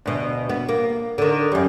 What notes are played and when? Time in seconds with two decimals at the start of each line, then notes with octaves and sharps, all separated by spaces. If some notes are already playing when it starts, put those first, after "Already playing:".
0.06 D2 B2
0.49 B3
0.69 A#3
1.18 D3 D#3
1.52 F#2 G3